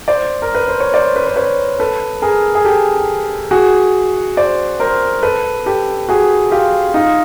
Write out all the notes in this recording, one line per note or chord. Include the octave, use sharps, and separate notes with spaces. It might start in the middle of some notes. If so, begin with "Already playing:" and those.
C5 D5
A#4
B4
C5
C#5
C5 D5
B4
C5
B4 C#5
A4 B4
G#4 A#4
G#4
G4 A4
F#4 G#4
C5 D5
A#4 C5
A4 B4
G4 A4
F#4 G#4
F4 G4
D#4 F4